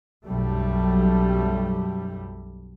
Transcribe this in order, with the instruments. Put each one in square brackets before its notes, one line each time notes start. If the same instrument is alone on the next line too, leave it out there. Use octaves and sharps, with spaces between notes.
[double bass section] B1 F#2 G3 A3